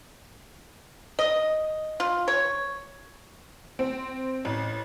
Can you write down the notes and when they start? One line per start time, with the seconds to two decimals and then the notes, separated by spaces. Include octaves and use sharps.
1.19 D#5
2.00 F4
2.28 C#5
3.79 C4
4.45 A1